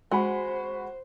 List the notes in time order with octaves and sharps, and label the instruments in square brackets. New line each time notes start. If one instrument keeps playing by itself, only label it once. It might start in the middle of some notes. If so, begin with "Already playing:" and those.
[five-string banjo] G#3 [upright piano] F#4 F#5 B5 [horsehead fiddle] C5